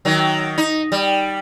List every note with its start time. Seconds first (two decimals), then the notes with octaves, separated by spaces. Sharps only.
0.05 D#3 F#3
0.58 D#4
0.92 G3